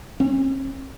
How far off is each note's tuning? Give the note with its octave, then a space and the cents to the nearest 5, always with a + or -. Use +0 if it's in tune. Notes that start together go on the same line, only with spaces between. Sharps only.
C#4 -45